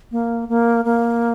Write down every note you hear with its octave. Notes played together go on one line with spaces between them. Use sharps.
A#3
A#3
A#3